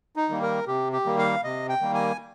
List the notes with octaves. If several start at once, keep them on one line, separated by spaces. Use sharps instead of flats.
D#4
D#3 G3 A#3
A#4
C3 G4
G4
D#3 G3 A#3
F5
C3 D#5
G5
D#3 G3 A#3
G#5